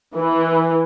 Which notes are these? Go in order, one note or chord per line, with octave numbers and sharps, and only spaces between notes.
E3